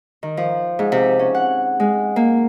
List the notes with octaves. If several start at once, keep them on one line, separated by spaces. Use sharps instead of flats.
D#3
F3
G#2
C3
C#4
F#5
G#3
A#3